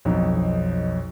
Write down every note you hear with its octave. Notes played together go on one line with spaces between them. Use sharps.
B1 F2 D#4